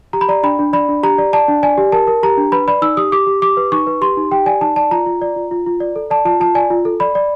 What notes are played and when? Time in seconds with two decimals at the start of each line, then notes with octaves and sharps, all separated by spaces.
0.13 G4 A#5
0.21 B5
0.29 D5 A#5
0.43 D4 B5
0.59 D4
0.73 D5 B5
0.89 D4
1.03 G4 A#5
1.18 D5
1.33 D5 A5
1.48 D4
1.63 D5 G#5
1.78 G4
1.92 A#4 A5
2.07 A#4
2.23 G4 A#5
2.37 D4
2.52 B4 B5
2.68 D5 B5
2.82 D#4 E6
2.97 G4 D#6
3.12 G4 D6
3.27 G4
3.42 G4 D6
3.57 B4
3.72 D#4 C#6
3.87 B4
4.01 G4 C6
4.17 D#4
4.31 G4 G5
4.46 D5 G#5
4.61 D#4 A5
4.76 D5 A5
4.91 F4 A#5
5.06 F4
5.22 D5
5.36 F4
5.51 F4
5.66 F4
5.80 D5
5.96 A4
6.10 D5 A5
6.25 F4 A5
6.40 F4 A5
6.55 D5 G#5
6.70 F4
6.85 A4
7.00 D5 B5
7.15 D5